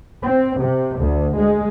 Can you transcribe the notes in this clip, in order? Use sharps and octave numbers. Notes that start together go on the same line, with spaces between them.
C4
C3
D2
G#3